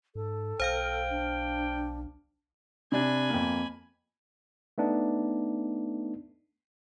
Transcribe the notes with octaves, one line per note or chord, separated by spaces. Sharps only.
G#2 A4
B1 C5 F5 G5 F6
D4
C3 D4 G#5 B5
F2 A#3
A3 B3 D4 D#4